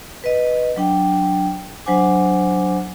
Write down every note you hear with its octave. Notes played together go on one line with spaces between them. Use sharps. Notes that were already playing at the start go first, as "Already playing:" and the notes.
B4 D#5
F#3 D4 G5
F#3 D4 C5 F#5 G#5 D6